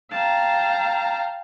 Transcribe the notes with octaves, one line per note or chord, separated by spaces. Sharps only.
F5 G5 A5 A#5